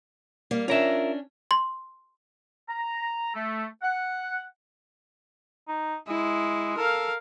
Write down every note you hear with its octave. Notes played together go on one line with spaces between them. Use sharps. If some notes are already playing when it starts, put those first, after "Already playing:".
G3 A#3
C#4 D4 F4 A#4 E5
C6
A#5
A3
F#5
D#4
G#3 E4
A4 A#4 F5